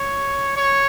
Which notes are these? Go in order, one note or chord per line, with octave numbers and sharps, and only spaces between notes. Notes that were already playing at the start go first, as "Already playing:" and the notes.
Already playing: C#5
C#5